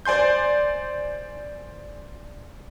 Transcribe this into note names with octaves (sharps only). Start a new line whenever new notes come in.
C5 D5 G#5 C6 G6